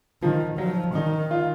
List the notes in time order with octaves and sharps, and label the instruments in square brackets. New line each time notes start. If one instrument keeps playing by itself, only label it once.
[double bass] D#3 [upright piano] F3
[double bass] F3 [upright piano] F#3
[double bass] D#3 [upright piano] D#4
[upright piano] F4